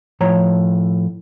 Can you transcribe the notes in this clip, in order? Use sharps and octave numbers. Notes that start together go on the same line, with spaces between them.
A2 F3 C#5 A#5